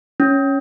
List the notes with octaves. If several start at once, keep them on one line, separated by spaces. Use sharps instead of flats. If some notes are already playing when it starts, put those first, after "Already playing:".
C#4